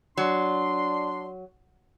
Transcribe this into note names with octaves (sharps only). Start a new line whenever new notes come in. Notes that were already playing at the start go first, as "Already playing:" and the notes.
F#3 D4 C6